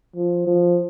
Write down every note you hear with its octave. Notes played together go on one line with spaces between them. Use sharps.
F3
F3